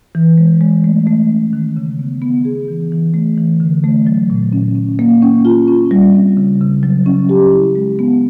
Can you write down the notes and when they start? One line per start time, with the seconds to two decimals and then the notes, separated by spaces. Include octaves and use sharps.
0.15 E3
0.38 G#3
0.61 G#3
0.84 A3
1.07 A3
1.30 C#4
1.53 D#3
1.77 C#3
1.99 B3
2.22 B3
2.45 G#4
2.68 E3
2.92 E3
3.14 A3
3.38 E3
3.60 D3
3.84 A3
4.07 F#3
4.30 A#2
4.53 C#4
4.75 C#4
4.99 A#3
5.22 C#4
5.45 F4
5.68 C#4
5.91 G3
6.14 C4
6.37 C#3
6.61 C#3
6.83 F#3
7.06 C#4
7.29 G4
7.52 E4
7.75 G#3
7.99 B3